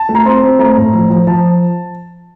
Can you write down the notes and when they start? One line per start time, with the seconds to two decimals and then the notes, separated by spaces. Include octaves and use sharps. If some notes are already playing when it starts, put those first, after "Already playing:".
Already playing: A5
0.09 A3
0.15 A#5
0.25 C4 C6
0.43 C4
0.59 A3 A#5
0.77 A2
0.93 F3
1.10 F3
1.27 F3 A5